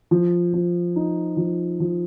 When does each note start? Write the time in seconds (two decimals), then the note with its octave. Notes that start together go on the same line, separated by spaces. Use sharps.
0.11 F3
0.54 F3
0.96 D#4
1.37 F3
1.80 F3